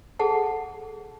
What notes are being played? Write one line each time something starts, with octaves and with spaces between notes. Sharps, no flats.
G#4 A4 F#5 A5